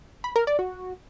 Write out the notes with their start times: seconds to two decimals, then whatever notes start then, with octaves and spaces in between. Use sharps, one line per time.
0.24 B5
0.36 A#4
0.47 D5
0.59 F#4